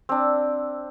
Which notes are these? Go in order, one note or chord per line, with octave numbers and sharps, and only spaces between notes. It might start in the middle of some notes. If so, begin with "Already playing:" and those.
C4 D4